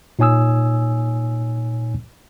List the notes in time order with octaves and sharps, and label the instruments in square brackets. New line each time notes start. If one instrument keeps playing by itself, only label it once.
[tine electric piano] A#2 D#4 C#5 G#5 D#6 E6